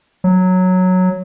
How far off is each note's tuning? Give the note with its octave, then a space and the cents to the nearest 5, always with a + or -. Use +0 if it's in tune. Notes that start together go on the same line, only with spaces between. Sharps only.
F#3 -5